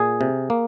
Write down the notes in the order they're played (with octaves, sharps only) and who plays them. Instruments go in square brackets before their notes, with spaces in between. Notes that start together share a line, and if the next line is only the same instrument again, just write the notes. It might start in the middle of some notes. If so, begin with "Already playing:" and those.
Already playing: [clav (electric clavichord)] A#2 G#4
C3
A#3